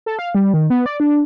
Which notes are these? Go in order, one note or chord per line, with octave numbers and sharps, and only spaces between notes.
A4
F5
G3
D#3
B3
D5
D4